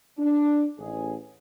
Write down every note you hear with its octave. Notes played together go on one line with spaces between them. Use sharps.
D4
A1 G#4